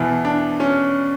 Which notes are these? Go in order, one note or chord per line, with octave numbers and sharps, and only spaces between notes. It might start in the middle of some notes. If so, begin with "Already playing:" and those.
Already playing: E2 B2 E4
D4
C#4